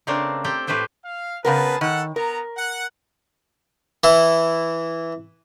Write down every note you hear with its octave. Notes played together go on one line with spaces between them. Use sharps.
C#3 A3 C4 D4 A#4
C4 G4 A4 G5
A2 A3 G4 B4 C5 G5
F5
C#3 B3 G#4 A#4 B4 A5
D#3 A4 F#5
B3 A#4 A#5
F#5
E3 E4